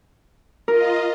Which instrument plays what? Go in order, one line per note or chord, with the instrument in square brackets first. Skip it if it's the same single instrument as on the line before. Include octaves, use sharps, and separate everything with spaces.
[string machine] F4 D#5 [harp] A#4